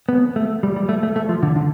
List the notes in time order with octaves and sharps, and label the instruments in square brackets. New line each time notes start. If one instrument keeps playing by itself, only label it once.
[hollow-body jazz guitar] B3
A3
G3
G3
A3
A3
A3
F3
D3
D3